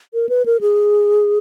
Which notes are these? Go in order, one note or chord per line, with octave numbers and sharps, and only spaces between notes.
A#4
B4
A#4
G#4